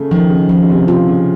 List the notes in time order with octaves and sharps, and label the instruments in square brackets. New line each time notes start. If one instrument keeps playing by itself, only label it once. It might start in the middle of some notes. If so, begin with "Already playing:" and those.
Already playing: [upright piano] C#3 A3
[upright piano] D#3 [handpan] F3
[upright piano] C#3
[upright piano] C#3 [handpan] F3
[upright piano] C#3
C3
[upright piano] C3 [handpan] F4
[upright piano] C#3